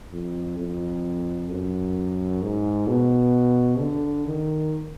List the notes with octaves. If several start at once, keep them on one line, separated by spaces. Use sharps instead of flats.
F2
F2
F#2
G#2
B2
D3
D#3